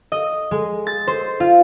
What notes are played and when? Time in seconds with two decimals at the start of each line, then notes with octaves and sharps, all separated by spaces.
0.12 D#5
0.51 G#3
0.87 A6
1.08 C5
1.40 F4